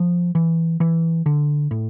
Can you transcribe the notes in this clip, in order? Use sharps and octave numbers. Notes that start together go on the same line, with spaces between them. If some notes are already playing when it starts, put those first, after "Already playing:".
Already playing: F3
E3
E3
D3
A2